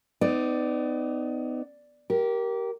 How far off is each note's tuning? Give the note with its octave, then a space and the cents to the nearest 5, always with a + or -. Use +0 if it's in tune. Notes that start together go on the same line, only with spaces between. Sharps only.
B3 +35 D#4 +0 D5 +0
G4 -20 A#4 +10